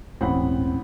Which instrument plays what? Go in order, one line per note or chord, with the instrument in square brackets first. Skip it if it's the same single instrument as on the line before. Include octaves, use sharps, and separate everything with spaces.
[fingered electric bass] D#1 G#2 [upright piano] A1 F#5 B5 [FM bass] C4